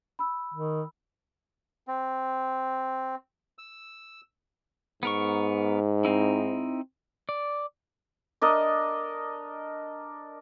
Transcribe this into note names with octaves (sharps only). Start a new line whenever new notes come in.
B5 E6
D#3
C4
E6
G#2 B3 A#4 C#6
C4 D#4 E4
D5
D4 A#4 D#5